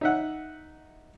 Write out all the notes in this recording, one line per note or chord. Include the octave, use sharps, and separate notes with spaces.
D#4 E5 F#5